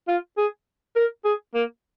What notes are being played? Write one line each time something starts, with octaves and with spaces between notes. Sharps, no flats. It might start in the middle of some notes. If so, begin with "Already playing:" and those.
F4
G#4
A#4
G#4
A#3